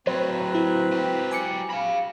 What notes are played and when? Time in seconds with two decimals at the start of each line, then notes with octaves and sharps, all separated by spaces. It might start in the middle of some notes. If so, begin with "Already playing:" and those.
0.07 A2 F#3 C4 B4 C5
0.55 E4
0.93 F#3 G4
1.31 G#5 D6 C#7
1.70 F5 B5